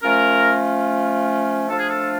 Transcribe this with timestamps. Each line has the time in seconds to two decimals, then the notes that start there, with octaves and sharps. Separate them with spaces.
0.02 F3 A3 C#4 F4 A#4
1.68 F3 A3 D4 F4 A4
1.78 G#4
1.88 A4